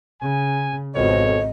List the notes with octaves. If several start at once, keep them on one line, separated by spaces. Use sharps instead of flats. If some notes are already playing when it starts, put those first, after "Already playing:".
C#3 G#5
G#1 F2 B2 C#5 D#5